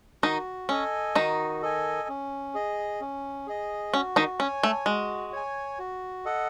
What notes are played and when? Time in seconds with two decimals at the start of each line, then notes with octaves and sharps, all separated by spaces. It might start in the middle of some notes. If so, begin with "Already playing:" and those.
0.23 D#3 D#4 F#4
0.69 C#4 A4 D#5 G#5
1.15 D#3 D#4 F#4
1.62 A4 D#5 G#5
2.09 C#4
2.54 G#4 D#5
3.01 C#4
3.47 G#4 D#5
3.93 C#4 F#4
4.16 D#3 D#4
4.39 C#4 G#5
4.42 C#5
4.63 A3
4.86 G#3 F#4
5.32 C#5 G#5
5.79 F#4
6.25 A4 D#5 F#5